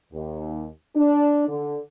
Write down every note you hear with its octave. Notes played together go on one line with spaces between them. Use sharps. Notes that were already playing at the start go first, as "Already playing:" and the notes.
D#2
D4
D3